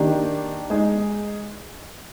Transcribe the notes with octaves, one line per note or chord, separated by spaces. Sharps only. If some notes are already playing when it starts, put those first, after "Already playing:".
Already playing: D#3 A#3 D4 G4
G#3 D#4 G#4